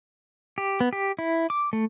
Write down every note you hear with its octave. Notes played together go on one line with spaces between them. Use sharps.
G4
B3
G4
E4
D6
A3